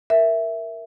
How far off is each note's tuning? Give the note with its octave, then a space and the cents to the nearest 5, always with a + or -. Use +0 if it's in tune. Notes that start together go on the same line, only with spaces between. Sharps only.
A#4 +0 E5 +0